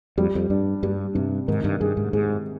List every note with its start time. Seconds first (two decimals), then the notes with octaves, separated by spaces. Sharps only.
0.18 F2 G3
0.35 F2
0.50 G2 D4
0.83 G2 G3
1.15 G2 C3
1.48 G#2 D#3
1.64 G2
1.80 G2 G#4
1.97 G#2
2.13 G#2 G#4